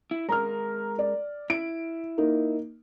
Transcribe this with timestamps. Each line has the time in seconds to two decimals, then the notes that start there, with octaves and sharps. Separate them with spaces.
0.11 E4
0.29 G#3 A#4 A#5 F6
0.99 D5
1.50 E4 D7
2.18 A#3 D#4